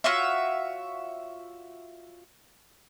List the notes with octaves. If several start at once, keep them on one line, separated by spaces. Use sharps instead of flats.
F4 F#4 C#5 E5